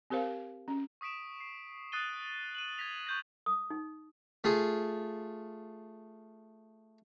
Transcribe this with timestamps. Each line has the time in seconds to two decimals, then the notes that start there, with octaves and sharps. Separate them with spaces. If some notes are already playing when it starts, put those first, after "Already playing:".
0.10 C4 G4 A#4 C5 F5
0.68 C#4
1.01 C#6 D#6 B6 D7 E7
1.40 C7
1.92 D#6 F#6 A6 C7 D#7 G7
2.55 D#7 E7 F#7
2.78 G#6 A#6 B6 F7
3.07 C#6 G6 A#6
3.46 D#6
3.70 D#4
4.44 A3 F4 G#4